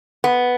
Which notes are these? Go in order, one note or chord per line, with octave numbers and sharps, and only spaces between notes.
B3